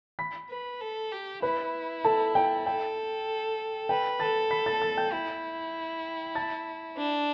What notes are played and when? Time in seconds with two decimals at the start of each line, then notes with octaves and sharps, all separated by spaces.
0.19 B5 B6
0.50 B4
0.80 A4
1.12 G4
1.42 E4 B4 B5
2.05 A4 A5
2.35 G5
2.66 A4 G5
3.89 B4 G5
4.20 A4 A5 A6
4.51 B5 B6
4.66 A5 A6
4.82 A5 A6
4.97 G5 G6
5.13 E4
6.35 A5 A6
6.98 D4